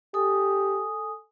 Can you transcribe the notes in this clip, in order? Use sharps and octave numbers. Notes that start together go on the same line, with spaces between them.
G4 A4 G#5 D#6